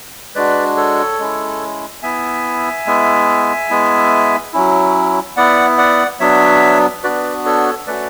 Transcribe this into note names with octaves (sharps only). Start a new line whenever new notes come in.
G#3 D4 F#4 B4 D5
A4 C#5
G#3 C#4 E4
B3 E4 E5 G#5
G#3 B3 E4
G#3 B3 E4
F#3 C#4 E4
B3 E4 D5 F#5
D5 F#5
F#3 B3 D4 C#5 E5
B3 D4 F#4 B4 D5
A4 C#5
A3 C#4 F#4 B4 D5